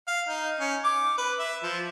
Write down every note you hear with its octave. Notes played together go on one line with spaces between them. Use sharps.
F5
D#4
C#4
D6
B4
E5
F3